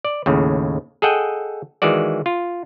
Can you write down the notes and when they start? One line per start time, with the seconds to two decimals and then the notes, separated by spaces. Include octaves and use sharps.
0.05 D5
0.26 D#2 A2 C#3
1.02 G#4 A4 D#5 F#5 G5
1.82 D#3 E3 G#3 F#4 D5
2.26 F4